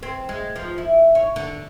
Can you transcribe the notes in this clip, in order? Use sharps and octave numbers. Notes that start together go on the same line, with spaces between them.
C4
G#3
F3
E4
C#5
D3